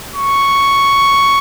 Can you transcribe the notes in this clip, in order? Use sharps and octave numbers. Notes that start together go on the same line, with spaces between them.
C#6